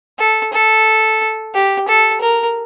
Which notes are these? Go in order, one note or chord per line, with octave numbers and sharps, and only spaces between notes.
A4
A4
G4
A4
A#4